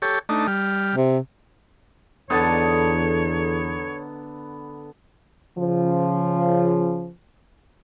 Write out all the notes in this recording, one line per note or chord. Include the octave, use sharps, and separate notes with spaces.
G4 A4 C#5
A3 D4 D#4
G3 F6
C3
E2 D3 B3 D#4 A4 C#5
C#3 F3